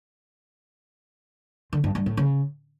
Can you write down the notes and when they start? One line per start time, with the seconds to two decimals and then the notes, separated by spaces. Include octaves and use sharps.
1.73 D3
1.84 G2
1.95 G2
2.06 A2
2.17 C#3